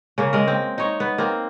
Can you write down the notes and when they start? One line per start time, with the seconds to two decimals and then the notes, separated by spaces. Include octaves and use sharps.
0.18 C#3 A#3
0.33 G#3 A#4
0.48 C4
0.78 D#4 C#5
1.00 B3
1.18 A#3 C4